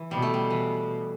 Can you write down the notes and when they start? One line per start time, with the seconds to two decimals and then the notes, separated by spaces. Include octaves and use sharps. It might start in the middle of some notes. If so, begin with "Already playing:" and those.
Already playing: E3
0.11 B2 G3
0.22 A3
0.34 G3
0.50 E3